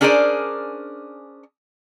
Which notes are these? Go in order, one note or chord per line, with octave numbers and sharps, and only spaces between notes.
C#4 D4 G#4 A#4 C5 D5